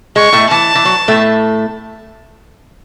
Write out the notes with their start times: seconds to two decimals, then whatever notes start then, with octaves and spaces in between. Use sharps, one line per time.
0.16 G#3 C#6
0.33 A2 A3
0.51 E3 A5
0.75 E3
0.85 F#3
1.08 A2 A3